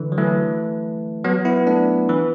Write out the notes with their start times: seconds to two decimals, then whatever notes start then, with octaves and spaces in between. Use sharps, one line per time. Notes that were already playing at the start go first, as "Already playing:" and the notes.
Already playing: D3 E3
0.12 F#3
0.18 E3 A3
1.24 F#3 B3
1.45 B3 E4
1.67 A3 D4
2.09 E3